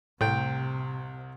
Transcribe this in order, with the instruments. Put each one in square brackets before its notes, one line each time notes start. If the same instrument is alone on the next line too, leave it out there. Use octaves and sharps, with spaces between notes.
[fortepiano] C2 G5 [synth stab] A2 [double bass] C3